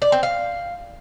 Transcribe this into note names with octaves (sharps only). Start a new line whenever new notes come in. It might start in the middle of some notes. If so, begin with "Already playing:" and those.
D5
C4
F5